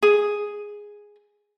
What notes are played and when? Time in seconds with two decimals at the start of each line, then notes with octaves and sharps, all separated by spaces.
0.03 G#4